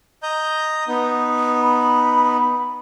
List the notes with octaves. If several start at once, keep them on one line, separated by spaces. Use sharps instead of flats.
D#5 A#5 G6
B3 D#4
B5